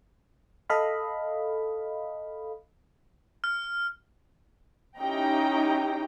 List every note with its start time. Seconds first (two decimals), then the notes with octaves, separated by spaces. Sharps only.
0.70 A4 D#5 F5 B5
3.44 F6
4.98 C#4 D#4 E4 G4 G5 A#5